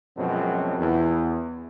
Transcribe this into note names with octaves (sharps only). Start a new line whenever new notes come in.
F#2 B2 F3 F#3 G#3 C4
E2